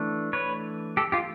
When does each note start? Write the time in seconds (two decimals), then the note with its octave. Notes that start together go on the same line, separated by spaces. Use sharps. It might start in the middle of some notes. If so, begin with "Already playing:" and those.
Already playing: E3 A3 D4
0.33 B4 C#5
0.97 G4 A4
1.12 F4 G4